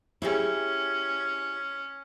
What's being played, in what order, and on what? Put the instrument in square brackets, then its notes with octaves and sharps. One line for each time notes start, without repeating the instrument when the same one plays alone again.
[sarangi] C#4 [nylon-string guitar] E4 G4 G#4